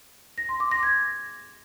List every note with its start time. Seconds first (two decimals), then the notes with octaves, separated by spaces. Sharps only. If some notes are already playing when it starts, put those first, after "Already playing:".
0.38 A#6
0.49 C6
0.60 D6
0.71 A#6
0.83 G#6